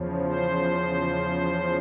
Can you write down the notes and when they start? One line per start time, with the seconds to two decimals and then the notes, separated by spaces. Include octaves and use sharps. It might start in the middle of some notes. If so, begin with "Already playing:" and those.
Already playing: E2 C#3 F3
0.25 C5